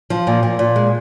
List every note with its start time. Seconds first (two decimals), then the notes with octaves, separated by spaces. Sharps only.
0.10 F3
0.27 A#2
0.43 A#2
0.59 A#2
0.76 G#3